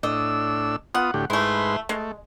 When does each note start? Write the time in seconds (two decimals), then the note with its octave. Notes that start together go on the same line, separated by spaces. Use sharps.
0.03 A2 D4 D#5 E6
0.95 B3 F4 F#5 D#6
1.14 D2 A2 G4
1.30 G#2 A3 E4 B4 C6
1.89 G#3 A3